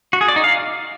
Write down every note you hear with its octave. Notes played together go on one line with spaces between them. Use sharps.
F#4
G#4
D5
D#4
F5